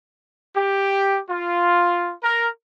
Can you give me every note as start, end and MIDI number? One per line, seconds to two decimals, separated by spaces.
0.55 1.20 67
1.29 2.12 65
2.22 2.48 70